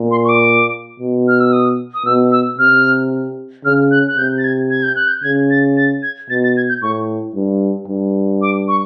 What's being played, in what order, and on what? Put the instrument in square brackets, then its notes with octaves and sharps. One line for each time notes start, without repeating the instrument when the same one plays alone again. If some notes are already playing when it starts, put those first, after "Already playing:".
Already playing: [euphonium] A#2
[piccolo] C6
C#6
D6
[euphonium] B2
[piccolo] F6
E6
D#6
D#6
[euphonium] B2 [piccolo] E6
[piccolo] E6
[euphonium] C3 [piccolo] F6
[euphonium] C#3 [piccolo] F6
[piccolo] F#6
F#6
[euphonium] C3 [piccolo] G6
[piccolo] A6
G#6
G#6
G6
F#6
G6
[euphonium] C#3 [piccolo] G#6
[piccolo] A6
A6
G#6
[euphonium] B2 [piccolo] A6
[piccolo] A6
G#6
G6
[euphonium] A2 [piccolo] C#6
[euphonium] G2
G2
[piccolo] D6
C#6